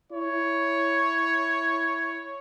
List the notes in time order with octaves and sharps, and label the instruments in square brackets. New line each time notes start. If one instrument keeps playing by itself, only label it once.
[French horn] E4 [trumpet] C#5